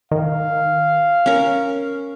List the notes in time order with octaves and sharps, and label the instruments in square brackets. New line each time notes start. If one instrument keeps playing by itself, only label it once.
[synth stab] D#3 [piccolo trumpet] F5
[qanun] C#4 A#4